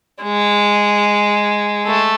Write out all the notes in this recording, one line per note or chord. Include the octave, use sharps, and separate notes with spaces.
G#3
A3